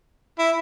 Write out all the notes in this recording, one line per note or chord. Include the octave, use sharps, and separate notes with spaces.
E4